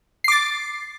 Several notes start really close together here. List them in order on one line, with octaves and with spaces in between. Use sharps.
C7 D6 A6